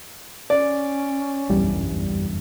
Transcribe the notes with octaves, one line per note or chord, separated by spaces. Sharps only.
C#4 D5
F#1 B1 E2 G2 G3